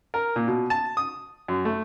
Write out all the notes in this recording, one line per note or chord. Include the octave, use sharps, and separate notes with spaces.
A#4
A#2
B2
A5
D#6
F#2
A3